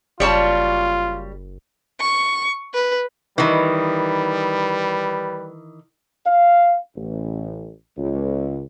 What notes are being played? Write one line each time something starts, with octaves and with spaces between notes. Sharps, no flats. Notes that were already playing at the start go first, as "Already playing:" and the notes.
F#1 G3 F4 C#5 A5
C#6
B4
D#3 E3 G3 B4
F5
A1
C#2